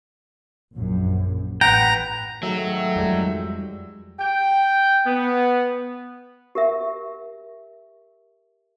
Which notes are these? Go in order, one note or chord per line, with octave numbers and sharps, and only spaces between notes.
A#1 F#2
A1 B4 F#5 G5 A#5
G#2 D#3 F#3 A3 E5
F2 G3 G#3
G5
B3
G4 A#4 E5